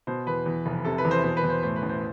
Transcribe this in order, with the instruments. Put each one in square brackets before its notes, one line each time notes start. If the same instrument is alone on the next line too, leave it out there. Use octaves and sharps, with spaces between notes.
[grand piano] B2 C5
E2 B4
E2
F1
C3 A4
B4
E2
C5
B2 C5
B4
E2
C5
A2 C5
B4
A1
C5